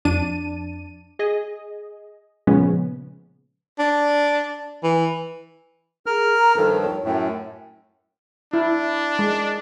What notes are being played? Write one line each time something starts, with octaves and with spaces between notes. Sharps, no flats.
F2 D4 A5 D#7
G#4 D#5
A#2 C#3 F3 G#3 B3 C#4
D4
E3
G#4 A#4 F6
A#5
G2 D#3 F3 A4
C#5
F#2 A2 G5
D4 E4
G#3